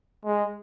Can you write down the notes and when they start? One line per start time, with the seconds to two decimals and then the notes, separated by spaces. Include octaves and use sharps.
0.25 G#3